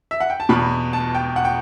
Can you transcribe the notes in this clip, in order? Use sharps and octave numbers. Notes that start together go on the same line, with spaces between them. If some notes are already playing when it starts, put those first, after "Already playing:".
E5
F#5
G5
A5
E2 B2 B5
A5
G5
F#5
G5